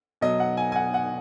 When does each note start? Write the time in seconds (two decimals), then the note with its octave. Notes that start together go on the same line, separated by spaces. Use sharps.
0.21 B2 F#3 D#5
0.40 F#5
0.57 G#5
0.72 G#5
0.76 F#5
0.94 F#5